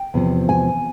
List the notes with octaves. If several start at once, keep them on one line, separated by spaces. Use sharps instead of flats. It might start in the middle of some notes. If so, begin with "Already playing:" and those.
Already playing: G5
E2 C3 F3
G#5